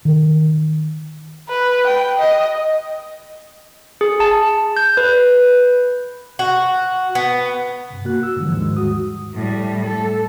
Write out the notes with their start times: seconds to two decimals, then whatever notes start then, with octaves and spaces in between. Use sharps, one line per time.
0.05 D#3
1.49 B4
1.87 G5
2.18 D#5
4.01 G#4
4.20 A5
4.77 G6
4.97 B4
6.39 F#4
7.15 B3
7.90 G2 C3
8.05 A#3 F#4 F#6
8.23 E6
8.37 G#2 D3 E3 F3 G3
8.55 D#2 G#2 D#3 G#3
8.77 F#4 D#6
9.34 A2 G3
9.86 A4